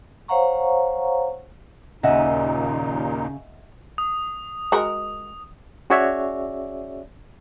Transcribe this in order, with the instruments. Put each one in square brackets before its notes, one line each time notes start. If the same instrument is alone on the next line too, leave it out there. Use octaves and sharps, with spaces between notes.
[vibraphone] C5 C#5 F5 F#5 A#5 C#6
[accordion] D#2 A#2 D#4 [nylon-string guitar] C#3 [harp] D#5 E5 F#5
[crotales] D#6
[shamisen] G#3 F#4 A#4
[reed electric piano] C#4 F#4 G#4 C#5 D5 E5